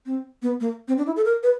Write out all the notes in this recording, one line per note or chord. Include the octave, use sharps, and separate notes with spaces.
C4
B3
A#3
C4
D4
E4
A4
A#4
B4